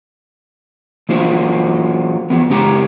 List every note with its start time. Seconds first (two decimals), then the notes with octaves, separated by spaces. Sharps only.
1.09 E3 F#3 A#3 F4 C5
2.30 E3 F3 B3
2.50 C#3 G#3 C#4 G4 A#5